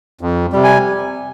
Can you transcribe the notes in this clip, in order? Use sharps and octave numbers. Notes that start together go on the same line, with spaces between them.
F2
C3 G3
G#5